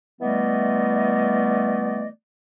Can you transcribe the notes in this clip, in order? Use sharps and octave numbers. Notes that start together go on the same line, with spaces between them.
E3 G3 A3 B3 D5 D#5